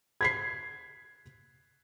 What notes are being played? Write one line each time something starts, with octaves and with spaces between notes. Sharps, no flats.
G#6 B6 C7